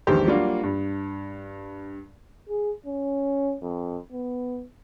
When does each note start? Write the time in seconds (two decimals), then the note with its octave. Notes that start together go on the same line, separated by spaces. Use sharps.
0.07 A#1 E2 D#3 G#3 G4 C5
0.27 F#3 G3 A#3 D4 F4 F#4
0.63 G2
2.49 G#4
2.86 C#4
3.62 F2
4.12 B3